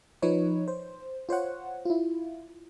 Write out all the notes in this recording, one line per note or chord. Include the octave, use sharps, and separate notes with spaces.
F3 D#4 B4 C#5
C5
F4 C5 C#5 F#5
E4 F4